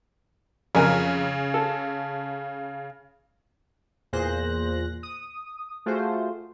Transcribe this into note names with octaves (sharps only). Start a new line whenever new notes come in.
F2 C#3 A#4 G#5
A4
E2 A#2 G#4 C5 F#6 A#6
D#6
A3 F4 F#4 G#4 C5